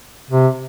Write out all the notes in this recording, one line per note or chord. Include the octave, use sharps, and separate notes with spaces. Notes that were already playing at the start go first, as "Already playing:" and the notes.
C3